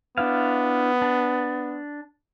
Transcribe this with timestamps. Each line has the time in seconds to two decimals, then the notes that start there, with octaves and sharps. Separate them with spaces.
0.18 B3 D4 E4 F5
1.02 D4